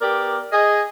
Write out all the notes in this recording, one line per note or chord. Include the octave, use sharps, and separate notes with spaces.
B3 G4 A#4 D5
G#4 D#5